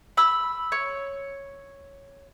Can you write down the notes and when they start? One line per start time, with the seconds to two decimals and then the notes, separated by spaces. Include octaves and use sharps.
0.17 B5 E6
0.72 C#5